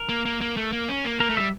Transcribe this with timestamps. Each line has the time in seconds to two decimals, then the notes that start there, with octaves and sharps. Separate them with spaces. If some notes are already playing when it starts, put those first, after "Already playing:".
Already playing: A#4
0.09 A#3
0.26 A#3
0.41 A#3
0.57 A3
0.72 A#3
0.89 C#4
1.05 A#3
1.20 A#3 A#4
1.29 A3
1.37 G3 E5